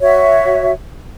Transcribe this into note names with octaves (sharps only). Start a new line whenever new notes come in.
F#4 C#5 E5